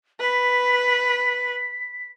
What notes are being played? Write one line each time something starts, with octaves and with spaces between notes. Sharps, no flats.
B4 B6